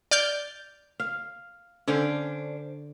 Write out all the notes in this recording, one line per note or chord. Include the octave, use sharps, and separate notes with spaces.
D5 F6 G6
F5
D3 C#4 D4 C5